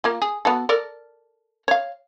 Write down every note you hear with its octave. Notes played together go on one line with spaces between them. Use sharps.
A#3 F4
G#4
B3 F#4 A4
A4 A#4 D5
C#5 F5